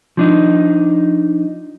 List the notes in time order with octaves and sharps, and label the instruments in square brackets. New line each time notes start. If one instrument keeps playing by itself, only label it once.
[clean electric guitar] F3 D4 D#4